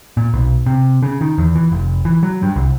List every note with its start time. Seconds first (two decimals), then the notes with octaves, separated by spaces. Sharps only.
0.17 A#2
0.33 B1
0.66 C3
1.03 C#3
1.21 D#3
1.38 E2
1.56 E3
1.72 F1
2.05 E3
2.23 F#3
2.43 G2
2.56 C2